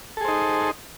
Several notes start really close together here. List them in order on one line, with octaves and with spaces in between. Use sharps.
A4 G#4 C5 D#4